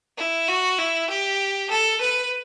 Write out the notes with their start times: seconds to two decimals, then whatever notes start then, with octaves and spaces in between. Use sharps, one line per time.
0.17 E4
0.48 F#4
0.78 E4
1.09 G4
1.70 A4
2.01 B4